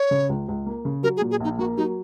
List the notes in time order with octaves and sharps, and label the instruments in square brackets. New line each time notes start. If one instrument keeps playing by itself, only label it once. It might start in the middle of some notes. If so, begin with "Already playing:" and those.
Already playing: [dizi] C#5
[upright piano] C#3
C#2
C#2
A#3
C#3
[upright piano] F#3 [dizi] A#4
[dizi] G#4
[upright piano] A#2
[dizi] G#4
[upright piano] A#1 [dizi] D#4
[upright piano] A#3 [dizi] F#4
[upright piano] F#3 [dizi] D#4